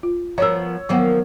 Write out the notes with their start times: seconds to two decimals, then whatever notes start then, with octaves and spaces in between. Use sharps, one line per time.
0.03 F4
0.38 F3 B3 A#4 C#5 E6
0.89 D#3 F3 F#3 A#3 B3 F#5